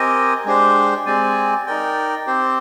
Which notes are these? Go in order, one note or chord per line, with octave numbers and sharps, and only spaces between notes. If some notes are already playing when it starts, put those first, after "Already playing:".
Already playing: C4 G4 A#4 D#5 G#5
G#3 D4 G4 C5
G#3 C4 G4 D5 G#5
D#4 A#4 D5 G5
C4 G4 C5